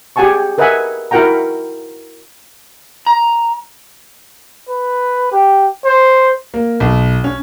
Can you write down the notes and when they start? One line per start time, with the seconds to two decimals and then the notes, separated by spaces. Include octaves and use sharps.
0.16 G4 G#4 F#5 G#5 A5 C#6
0.58 A#4 B4 D#5 E5 F#5 G#5
1.11 E4 F#4 A#4 F#5 G5 A#5
3.06 A#5
4.69 B4
5.32 G4
5.85 C5
6.54 A#3
6.80 B1
7.24 C#4